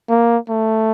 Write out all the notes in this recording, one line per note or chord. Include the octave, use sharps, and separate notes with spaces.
A#3
A3